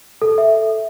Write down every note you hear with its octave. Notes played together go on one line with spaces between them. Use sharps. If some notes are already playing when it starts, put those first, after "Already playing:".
A4
E5